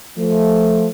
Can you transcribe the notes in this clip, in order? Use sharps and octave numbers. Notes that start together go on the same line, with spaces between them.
F3 A3